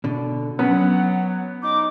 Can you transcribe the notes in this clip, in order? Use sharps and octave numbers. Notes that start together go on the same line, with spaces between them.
B2 D3
F#3 B3 C#4 F#5
D#4 D6